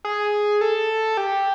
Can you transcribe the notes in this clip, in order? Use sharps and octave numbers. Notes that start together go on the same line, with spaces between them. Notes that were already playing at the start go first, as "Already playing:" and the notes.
G#4
A4
G4